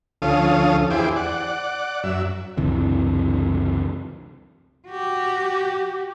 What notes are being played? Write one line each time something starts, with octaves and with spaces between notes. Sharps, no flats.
D2 F3 C#4 A4 F5 D#6
E2 E4 G4 G#4 C5 D6
D5 F#5
F#2 E5
C#2 F#2 C3 E3
F#4 G4